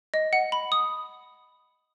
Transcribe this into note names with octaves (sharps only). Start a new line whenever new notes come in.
D#5
F#5
B5
D#6